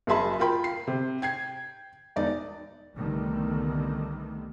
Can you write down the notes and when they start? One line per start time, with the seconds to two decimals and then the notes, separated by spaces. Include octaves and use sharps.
0.07 F#1 F#3 G#4 E5 A5 B5
0.39 F4 A#4 G5 B5
0.64 C7
0.87 C3
1.22 G5 G#6 C7
2.16 E1 D#4 D5
2.97 C2 D3 D#3 G3 A3 B3